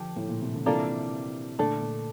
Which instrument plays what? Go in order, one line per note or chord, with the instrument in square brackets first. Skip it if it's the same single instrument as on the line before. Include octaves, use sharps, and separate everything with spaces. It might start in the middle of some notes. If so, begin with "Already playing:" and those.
Already playing: [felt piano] D3 F3 [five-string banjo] D4 G4
[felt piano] A2
A#2
C3
D3
[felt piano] C3 E3 [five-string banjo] G3 A#3 D4 F4 A4
[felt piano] A#2 D3 [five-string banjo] A3 D4 A4
[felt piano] A#2